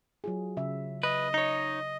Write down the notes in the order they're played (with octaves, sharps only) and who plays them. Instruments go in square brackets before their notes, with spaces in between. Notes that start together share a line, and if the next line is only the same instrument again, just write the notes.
[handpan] F#3 F4 G#4
C#3 E5
[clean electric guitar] B4 [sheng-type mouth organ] D#5
[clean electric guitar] D#4 C#5